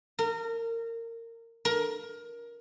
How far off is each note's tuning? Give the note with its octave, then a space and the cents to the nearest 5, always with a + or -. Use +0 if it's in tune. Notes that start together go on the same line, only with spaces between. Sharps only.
A#4 -25
A#4 +20